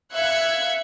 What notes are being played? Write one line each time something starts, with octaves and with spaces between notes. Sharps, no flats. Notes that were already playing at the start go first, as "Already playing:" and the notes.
E5 F5 F#6 G#6 C#7